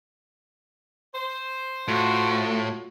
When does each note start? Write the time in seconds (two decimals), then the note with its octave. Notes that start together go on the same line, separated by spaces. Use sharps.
1.14 C5
1.88 A2 F4 F#4